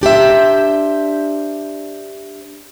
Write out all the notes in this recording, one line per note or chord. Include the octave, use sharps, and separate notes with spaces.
D4 G4 C5 E5